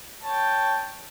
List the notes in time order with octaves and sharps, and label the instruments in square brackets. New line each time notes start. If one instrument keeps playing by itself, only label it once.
[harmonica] C#5 G5 A5